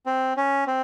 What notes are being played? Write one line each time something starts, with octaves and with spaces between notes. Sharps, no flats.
C4
C#4
C4